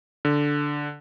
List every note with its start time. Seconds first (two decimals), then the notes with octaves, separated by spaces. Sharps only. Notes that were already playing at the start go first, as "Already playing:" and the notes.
0.25 D3